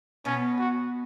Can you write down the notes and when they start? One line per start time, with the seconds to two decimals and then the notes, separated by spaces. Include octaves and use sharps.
0.25 B2 B3 C#4
0.59 F#4